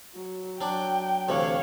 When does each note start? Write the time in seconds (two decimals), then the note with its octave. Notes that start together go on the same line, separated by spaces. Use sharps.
0.14 F#3
0.61 F#3 D4 G5
1.29 D2 C3 E3 C#5 F5